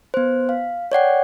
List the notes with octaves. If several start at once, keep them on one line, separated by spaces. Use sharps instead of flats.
B3 C5
F5
C#5 D5 F#5 G5